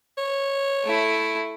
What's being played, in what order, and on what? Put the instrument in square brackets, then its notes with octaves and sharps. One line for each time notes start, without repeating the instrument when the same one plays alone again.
[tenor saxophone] C#5
[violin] A3 E4